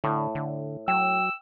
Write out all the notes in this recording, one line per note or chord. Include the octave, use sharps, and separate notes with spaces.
A2 D3
D3
F#3 G5 E6